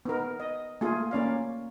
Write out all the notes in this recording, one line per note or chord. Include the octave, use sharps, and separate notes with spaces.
B3 D#4 A#4
D#5
A3 A#3 F4 G#4
A#3 C#4 D5 F5